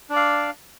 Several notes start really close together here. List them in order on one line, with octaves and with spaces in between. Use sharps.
D4 D5 F5